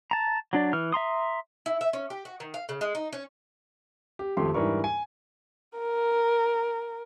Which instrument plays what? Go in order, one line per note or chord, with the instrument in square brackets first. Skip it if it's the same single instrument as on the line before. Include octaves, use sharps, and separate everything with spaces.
[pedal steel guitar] A5 A#5
F#3 D4 D5
E3 F6
E5 A#5 C6 D#6
[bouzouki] E4
E5
C#4
G4
F#4
D#3
F5
C#3
G#3
D#4
C#4
[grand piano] G4
G#1 F2 A3 G4 C6
G#2 E3 G3 D4 A#4 C#6
G#5
[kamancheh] A#4